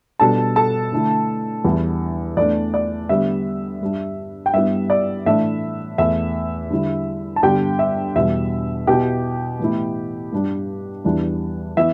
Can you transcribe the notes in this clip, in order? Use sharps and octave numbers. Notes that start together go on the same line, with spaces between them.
B2 G3 B3 D4 A4 A5
A4 A5
D3 A3 E4
E2 E3 G3 E4
E2 E3 A3 D4 D5
D5
D3 G3 B3 E5
G2 G3 D4
G5
G2 G3 B3 E4 E5
D5
A2 E3 A3 D4 E5
E2 E3 A3 E5
D3 G3 E4
A5
G2 D3 G3 B3 D4 G4 G5
E5
E2 B2 G3 E5
B2 B3 E4 G4 G5
A2 E3 B3 E4
G2 G3 D4
E2 E3 G3 D4
E3 B3 E5